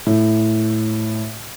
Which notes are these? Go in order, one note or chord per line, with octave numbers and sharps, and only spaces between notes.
A2